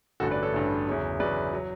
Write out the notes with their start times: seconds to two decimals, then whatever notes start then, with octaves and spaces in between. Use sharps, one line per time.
0.20 A1 G2 D3 F#4 A4
0.31 B4 D5
0.43 A4 C#5
0.53 A1 G2 D3
0.87 E2 C#3 F#3
1.20 E2 C#3 F#3 B4 D5
1.53 F#3